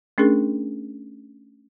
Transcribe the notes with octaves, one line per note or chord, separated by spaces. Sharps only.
A3 C#4 D4 G#4 A#4